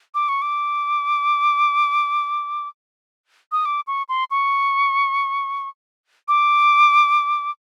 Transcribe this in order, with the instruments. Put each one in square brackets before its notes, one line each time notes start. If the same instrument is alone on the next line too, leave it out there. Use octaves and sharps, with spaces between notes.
[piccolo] D6
C#6
D6
D#6
D6
C#6
C6
C#6
D6